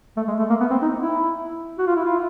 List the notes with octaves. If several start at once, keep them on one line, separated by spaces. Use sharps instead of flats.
A3
G#3
A3
A#3
B3
C4
D#4
E4
F#4
F4
E4
F4